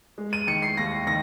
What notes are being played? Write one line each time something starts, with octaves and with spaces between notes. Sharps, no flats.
G#3
D#7
D#3 C#7
C7
D#2 A#6
D#3 A#6